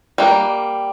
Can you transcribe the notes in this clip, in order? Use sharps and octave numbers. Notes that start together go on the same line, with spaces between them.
G3 A#3